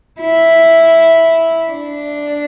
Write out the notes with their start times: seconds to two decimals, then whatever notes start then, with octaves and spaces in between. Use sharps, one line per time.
0.21 E4
1.71 D4